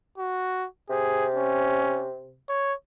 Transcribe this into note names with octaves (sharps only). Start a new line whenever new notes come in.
F#4
C3 G#4
C#4
C#5